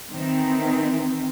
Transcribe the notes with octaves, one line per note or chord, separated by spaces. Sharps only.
D#3 E3 C4